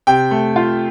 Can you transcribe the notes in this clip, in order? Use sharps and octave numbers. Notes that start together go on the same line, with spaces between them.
C3 G5
A3
F4